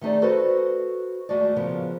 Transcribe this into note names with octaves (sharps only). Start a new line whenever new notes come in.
D#3 A3 D#4 G#4 D5
F#4 A4 B4 C5 D#5
D#2 G#3 A3 F#4 D5
C#3 F3 B3 A#4